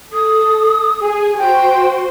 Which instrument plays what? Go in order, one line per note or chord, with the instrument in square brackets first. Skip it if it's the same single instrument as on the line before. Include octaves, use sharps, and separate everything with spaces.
[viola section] A4 [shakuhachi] D#6
[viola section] G#4 [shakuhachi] G#5
[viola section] F#4 C5 [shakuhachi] G5